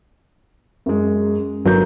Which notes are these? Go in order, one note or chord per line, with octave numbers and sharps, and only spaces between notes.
F#2 G#3
G1 F#3 A#4 C#5 A#5 G6